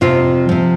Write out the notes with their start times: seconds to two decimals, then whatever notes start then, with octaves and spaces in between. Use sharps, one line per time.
0.01 F2 C3 F3 F4
0.49 C3 F3